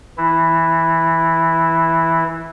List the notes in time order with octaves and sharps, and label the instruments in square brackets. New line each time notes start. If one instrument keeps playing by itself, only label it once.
[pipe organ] E3 E4